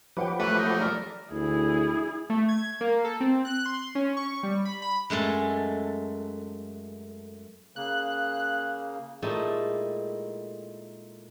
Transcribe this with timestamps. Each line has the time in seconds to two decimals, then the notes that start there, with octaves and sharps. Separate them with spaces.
0.17 F3 F#3 G4 B4 F#5 G5
0.40 A3 B4 F#5 B5
0.58 D#4
0.80 A4 A#4 D5
1.31 D2 E4 G#4
2.30 A3
2.49 G#6
2.81 A#3
3.04 A4
3.21 C4
3.45 F#6
3.66 C6
3.95 C#4
4.17 C#6
4.43 G3
4.65 B5
4.82 B5
5.10 F#2 G#3 A3 A4
7.76 C#3 A#3 F#6
9.22 A#2 G#3 A3 D#4 E4 G4